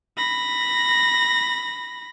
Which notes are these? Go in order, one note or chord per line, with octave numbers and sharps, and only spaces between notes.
B5 A#6